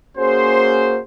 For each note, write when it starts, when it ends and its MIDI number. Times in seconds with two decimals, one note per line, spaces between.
0.17 1.01 58
0.17 1.01 61
0.17 1.01 66
0.17 1.01 68
0.17 1.01 72